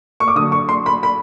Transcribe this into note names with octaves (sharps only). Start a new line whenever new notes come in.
C#6
D6
D3 F#3 D#6
C#6
C6
B5
B5